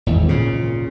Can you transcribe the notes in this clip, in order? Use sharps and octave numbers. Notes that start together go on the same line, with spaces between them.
G#1 E2
A#2 C#3